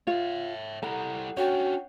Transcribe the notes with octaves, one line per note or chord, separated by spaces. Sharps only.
F4 C#5 E5
G3 E4 A4 F#5 A#5
C#4 D4 F#4 C#5 F#5 G5